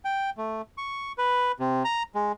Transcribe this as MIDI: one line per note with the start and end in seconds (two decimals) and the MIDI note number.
0.05 0.30 79
0.37 0.62 57
0.78 1.12 85
1.18 1.52 71
1.60 1.83 48
1.85 2.03 82
2.15 2.32 56